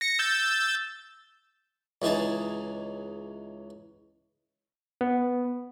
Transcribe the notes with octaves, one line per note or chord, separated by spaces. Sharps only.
A#6 C#7
E6 G6 A6
C#2 E3 D#4 G#4 A5
B3